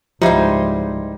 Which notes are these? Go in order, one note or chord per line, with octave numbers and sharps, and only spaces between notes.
C#2 G#2 F3 G3 D#4 E4 C5